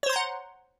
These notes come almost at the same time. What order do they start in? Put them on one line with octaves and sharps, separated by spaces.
C#5 C5 C6 A#5 F#5